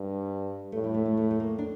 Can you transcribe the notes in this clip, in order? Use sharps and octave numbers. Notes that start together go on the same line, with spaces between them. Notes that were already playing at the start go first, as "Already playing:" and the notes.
Already playing: G2
A2 A3
G3
A3
A3
A3
A3
A#3
D4